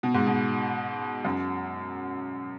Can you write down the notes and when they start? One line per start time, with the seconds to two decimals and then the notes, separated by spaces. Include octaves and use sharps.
0.03 B2
0.14 G#2
0.26 B2
1.25 F#2